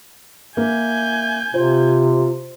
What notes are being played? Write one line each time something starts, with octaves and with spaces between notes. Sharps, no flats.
A#3 E5 G#5 G6
C3 F4 C5